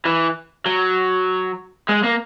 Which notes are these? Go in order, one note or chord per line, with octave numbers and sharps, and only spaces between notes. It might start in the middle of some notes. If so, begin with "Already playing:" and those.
E3
F#3
G#3
A#3